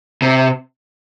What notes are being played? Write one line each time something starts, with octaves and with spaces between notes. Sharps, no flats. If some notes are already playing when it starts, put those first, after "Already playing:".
C3